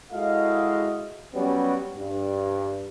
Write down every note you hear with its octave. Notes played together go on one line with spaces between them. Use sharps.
G#3 E4 F#4 A4 D#5 F5
F#3 G3 B3 C#4
G2